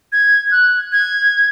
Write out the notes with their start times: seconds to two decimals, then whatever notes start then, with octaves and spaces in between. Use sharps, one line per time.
0.12 G#6
0.52 F#6
0.92 G#6